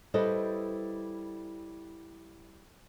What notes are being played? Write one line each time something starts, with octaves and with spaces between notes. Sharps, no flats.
G3 E4 A4 B4 C5 D#5